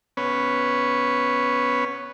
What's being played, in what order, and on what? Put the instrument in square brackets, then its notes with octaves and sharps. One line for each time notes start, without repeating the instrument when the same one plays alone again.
[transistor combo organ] B3 C#4 B4 C#5